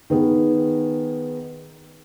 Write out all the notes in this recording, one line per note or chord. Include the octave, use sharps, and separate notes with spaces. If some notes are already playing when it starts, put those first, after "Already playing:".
D#3 B3 G#4